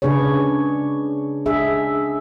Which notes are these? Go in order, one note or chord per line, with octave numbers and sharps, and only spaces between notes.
C#3 D4 G#4 B4 C#5
D4 G#4 E5